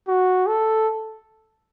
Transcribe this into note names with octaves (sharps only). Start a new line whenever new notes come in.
F#4
A4